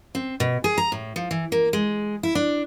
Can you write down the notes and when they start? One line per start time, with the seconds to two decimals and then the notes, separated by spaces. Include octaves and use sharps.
0.15 C4
0.40 B2
0.64 G#4
0.78 A#5
0.92 A2
1.16 F3
1.31 E3
1.52 A#3
1.73 G#3
2.23 E4
2.35 D4